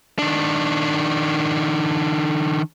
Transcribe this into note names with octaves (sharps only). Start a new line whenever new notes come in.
D#3 D4